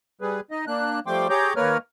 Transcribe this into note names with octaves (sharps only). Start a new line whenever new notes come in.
G3 G#4 B4
D#4 D#5
A#3 D4 F#6
F3 G3 A3 G5 C6 D6
G4 G#4 C#5 A#5 D6 G6
D#2 A#3 A#4 B4 C#5 F6